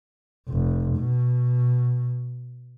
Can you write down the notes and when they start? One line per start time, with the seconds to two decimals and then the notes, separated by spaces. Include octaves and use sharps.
0.49 F1
0.97 B2